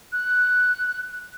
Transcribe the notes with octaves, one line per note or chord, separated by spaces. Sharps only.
F#6